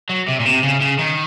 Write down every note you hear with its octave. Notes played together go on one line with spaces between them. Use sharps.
F#3
C3
A#2
C3
C#3
C#3
D#3